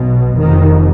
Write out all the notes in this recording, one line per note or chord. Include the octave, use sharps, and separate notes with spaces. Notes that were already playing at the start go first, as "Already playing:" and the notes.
Already playing: B1 B2
F1 F2 D#3